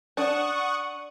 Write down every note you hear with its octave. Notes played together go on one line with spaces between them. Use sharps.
D4 F#5 C#6 D#6